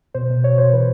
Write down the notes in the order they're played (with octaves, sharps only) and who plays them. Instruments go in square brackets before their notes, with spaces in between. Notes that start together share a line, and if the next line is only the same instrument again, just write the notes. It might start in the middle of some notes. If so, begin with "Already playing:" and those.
[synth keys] B2 C5
B2
B2 C#5
B2 C5
E3 B4